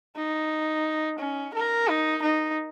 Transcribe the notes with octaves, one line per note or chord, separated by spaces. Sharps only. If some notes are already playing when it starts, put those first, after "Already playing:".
D#4
C#4
A#4
D#4
D#4